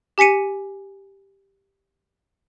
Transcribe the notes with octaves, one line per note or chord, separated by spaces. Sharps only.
G4 G#5 B6 C#7 D#7